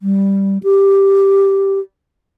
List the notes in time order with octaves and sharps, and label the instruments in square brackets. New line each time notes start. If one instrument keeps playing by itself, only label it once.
[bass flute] G3
G4